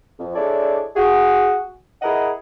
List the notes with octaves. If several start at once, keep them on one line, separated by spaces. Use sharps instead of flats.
F2
G#3 D4 E4 A4 C#5 D5
F#4 G#4
E4 G#4 A#4 D#5 F#5